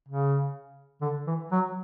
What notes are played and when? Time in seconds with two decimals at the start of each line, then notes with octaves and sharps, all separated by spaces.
0.08 C#3
1.01 D3
1.27 E3
1.52 F#3